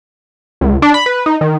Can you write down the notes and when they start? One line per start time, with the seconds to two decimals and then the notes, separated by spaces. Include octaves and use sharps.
0.61 C#2
0.82 D4
0.94 B5
1.06 B4
1.26 D#4
1.41 D#3